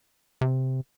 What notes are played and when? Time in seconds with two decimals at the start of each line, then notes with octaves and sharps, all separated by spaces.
0.41 C3